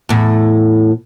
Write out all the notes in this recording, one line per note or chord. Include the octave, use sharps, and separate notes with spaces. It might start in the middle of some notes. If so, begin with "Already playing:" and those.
E2 A2